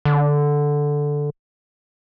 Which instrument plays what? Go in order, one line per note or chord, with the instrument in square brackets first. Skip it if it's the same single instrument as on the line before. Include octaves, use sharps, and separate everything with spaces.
[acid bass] D3